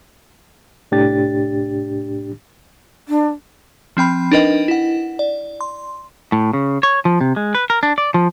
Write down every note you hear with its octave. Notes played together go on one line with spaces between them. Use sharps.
C2 A2 D4 G4 A6
D4
F3 C4 G5 B5
D4 D#4 A#4 B4 D#5 G5
E4 F#5
D5
C6
A2
C#3
C#5
F3
C3
G#3
B4
A#4
D4
D5
F3